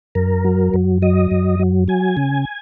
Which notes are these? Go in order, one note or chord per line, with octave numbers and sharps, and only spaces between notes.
F#2 A#4
F#3
F#2
F#3 D#5
F#2
F#3
F#3 G#5
C#3